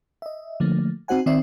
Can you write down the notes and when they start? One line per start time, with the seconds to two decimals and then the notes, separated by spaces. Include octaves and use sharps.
0.22 D#5 E5
0.60 D3 F3 A3 A#3
1.08 C4 D#4 F#4 C5 F#5 G#5
1.26 D#3 C4 D5 E5